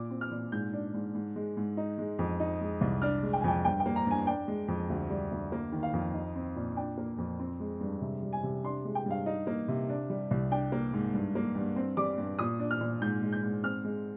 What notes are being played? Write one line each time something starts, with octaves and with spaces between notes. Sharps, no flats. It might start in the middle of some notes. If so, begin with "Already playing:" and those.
Already playing: A#2 D6
C4
F6
A#2
G#2 G6
D4
G#2
G#2
G#3
G#2
D#4
G#3
F2
D#4
G#3
C2
D4 F6
G#3
G5
G#5
F2 G5
G2 G5
G5
A#3
A#5
G2 G#5
D4 G5
G#3
F2
D2
G3
D2
A#3
D#3
F5
F2
D#4
C4
A#2
D4 G5
A#3
F2
C4
G#3
G2
C3
G3
G#5
C3
D4 C6
G#3
G5
G2 F5
D#4
A#3
C3
D4
G3
C2
D4 G5
A#3
G#2
G2
A#3
G2
C4
G3 D6
G2
A#2 D#6
D4
F6
A#2
G#2 G6
G#3
G6
G#2
C4 F6
G#3